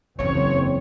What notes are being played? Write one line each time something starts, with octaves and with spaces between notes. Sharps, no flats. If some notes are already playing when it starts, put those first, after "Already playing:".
F#1 E2 E3 C4 C#5